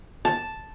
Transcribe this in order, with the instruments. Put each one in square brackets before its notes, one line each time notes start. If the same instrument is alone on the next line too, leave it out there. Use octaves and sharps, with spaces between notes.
[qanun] A5